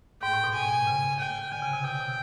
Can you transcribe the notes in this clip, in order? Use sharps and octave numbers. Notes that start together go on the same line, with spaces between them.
G#2 G5
A2
B2
G#5
C#3
G5
D3 G#5
C#3
C3
B2 G5
C3